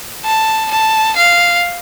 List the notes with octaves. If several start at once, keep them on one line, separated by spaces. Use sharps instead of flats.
A5
A5
F5